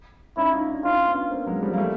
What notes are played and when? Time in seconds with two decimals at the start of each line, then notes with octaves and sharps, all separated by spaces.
0.37 C#4 D#4 E4
0.53 D#4 F4
0.68 D4 E4
0.84 C#4 D#4 F4
1.04 D4
1.08 B3 C#4
1.31 A#3 C4
1.46 F#3 G#3
1.62 F3 G3
1.74 A#3
1.78 G3 A3